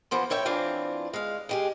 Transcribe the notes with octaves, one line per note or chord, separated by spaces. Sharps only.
E3 F3 B3 C5
A2 C#5 E5 G5
E3 C4 D4 F4
G#3 F5
G#3 G4 G#4